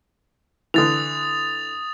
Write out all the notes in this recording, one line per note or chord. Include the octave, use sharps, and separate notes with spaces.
D3 E3 D#6 A6 F7